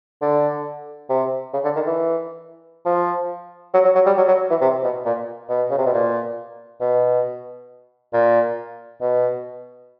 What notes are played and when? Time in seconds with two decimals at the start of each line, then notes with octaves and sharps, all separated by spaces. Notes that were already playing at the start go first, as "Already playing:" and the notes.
0.22 D3
1.10 C3
1.53 C#3
1.64 D3
1.76 D#3
1.86 E3
2.86 F3
3.74 F#3
3.85 F#3
3.95 F#3
4.06 G3
4.17 F#3
4.28 F#3
4.50 E3
4.61 C3
4.83 B2
5.05 A#2
5.49 B2
5.71 C#3
5.78 C3
5.86 B2
5.93 A#2
6.81 B2
8.13 A#2
9.01 B2